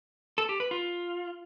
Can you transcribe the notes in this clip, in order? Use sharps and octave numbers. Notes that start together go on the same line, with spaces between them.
A4
G4
B4
F4